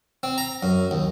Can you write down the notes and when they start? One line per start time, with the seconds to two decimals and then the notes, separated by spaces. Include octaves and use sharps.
0.23 C4
0.38 A#5
0.63 F#2
0.91 D#2